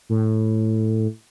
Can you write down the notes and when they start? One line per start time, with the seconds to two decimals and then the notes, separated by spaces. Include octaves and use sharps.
0.09 A2